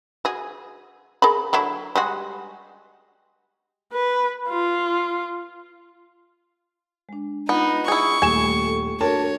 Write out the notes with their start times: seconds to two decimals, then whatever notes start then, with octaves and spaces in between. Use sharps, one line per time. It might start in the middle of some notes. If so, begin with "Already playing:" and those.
0.25 F#4 G#4
1.22 G#4 A#4 B5
1.53 D3 F#3 E4
1.96 G3 G#3 F#4
3.93 B4
4.48 F4
7.09 G#3 D4
7.49 B3 D#4 F4
7.88 E4 G#4 C#6
8.22 D#1 A3 G4 G#5 E7
8.62 A4
9.01 D4 F#4 A4 A#4 C#5 A5